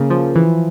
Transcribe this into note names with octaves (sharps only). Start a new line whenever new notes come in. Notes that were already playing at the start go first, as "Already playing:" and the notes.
Already playing: C#3 A#3
F3
E3